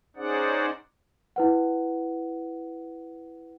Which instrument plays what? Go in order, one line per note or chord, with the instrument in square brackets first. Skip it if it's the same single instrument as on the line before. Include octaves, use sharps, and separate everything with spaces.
[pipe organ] C#4 D#4 G#4 C5 D5 F#5
[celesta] E4 B4 F#5